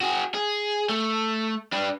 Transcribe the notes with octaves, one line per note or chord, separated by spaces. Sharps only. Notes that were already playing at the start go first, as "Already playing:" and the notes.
F#4 G#4
G#4
A3
D4 B4